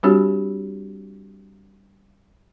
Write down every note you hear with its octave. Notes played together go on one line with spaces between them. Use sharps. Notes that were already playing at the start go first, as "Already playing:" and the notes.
G3 C4 D4 F#4 G4 C#5